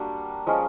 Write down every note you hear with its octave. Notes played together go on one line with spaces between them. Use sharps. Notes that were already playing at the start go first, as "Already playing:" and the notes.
Already playing: G3 A#3 D4 F#4
F3 G#3 C#4 F4